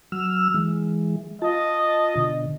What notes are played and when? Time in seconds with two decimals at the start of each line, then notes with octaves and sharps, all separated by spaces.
0.12 F#3 E6 F6
0.54 E3 G#3
1.42 F4 D#5 A5
2.16 B2 D3